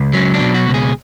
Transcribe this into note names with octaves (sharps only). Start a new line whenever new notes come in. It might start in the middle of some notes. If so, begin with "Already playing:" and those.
Already playing: C#2
F#3 C#4
D4
B2
F#4
C#2
G#4